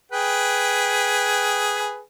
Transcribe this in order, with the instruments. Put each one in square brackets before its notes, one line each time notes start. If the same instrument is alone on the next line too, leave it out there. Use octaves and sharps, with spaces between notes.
[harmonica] G#4 B4 G5